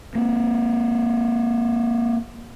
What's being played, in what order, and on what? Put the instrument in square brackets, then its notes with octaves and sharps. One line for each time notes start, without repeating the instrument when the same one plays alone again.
[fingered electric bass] A#3 C4